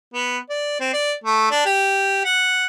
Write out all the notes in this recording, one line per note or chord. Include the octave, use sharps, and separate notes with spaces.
B3
D5
C4
D5
A3
D4
G4
F#5